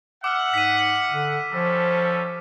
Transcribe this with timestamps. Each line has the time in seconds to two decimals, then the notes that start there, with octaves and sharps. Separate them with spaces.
0.24 E5 F#5 D6 E6 F6
0.54 G#2 B6 D#7
1.12 D3
1.53 F3 G3 C#4 A4